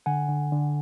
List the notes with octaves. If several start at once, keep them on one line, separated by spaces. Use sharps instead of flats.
D3 F#5 G#5
D3
D3